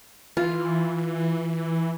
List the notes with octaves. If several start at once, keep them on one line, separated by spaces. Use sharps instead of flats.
E3 F4